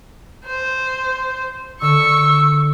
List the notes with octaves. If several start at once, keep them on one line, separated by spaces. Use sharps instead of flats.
C5
D3 C#6 E6